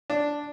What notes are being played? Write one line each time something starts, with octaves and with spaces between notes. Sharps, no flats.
D4